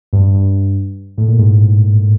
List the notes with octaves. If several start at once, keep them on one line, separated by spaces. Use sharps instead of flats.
G2
G2
A2
A#2
G#2